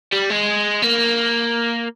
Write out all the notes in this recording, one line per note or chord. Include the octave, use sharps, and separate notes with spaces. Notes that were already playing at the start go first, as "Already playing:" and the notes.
G3
G#3
A#3